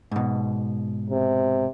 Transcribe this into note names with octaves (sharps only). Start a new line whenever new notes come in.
G#2 B2
C3